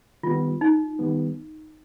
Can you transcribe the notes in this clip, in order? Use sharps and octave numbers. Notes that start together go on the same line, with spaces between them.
D#3 G3 B3 F4
D#4
D#3 G3 B3